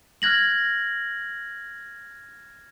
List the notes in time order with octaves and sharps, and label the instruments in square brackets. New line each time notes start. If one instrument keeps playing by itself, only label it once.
[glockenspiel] F6 F#6 G#6 A#6 F#7